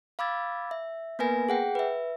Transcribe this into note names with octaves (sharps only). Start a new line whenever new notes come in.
F5 B5 D6 E6 G#6 A6
E5
A#3 B3 A#4 B4 G#5 A#6
G#4 F#5 G5
B4 E5